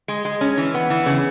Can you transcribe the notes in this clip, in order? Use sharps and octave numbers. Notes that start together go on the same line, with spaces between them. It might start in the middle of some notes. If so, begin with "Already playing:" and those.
G#3
G#3
C#4
E3
B3
E3
C#3